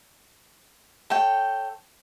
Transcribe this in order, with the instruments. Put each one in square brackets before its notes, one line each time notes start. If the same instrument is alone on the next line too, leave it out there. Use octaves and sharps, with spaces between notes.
[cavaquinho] A4 C#5 G5